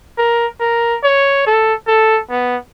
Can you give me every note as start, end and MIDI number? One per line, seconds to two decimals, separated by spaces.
0.18 0.47 70
0.60 0.98 70
1.03 1.43 73
1.47 1.74 69
1.87 2.20 69
2.30 2.56 59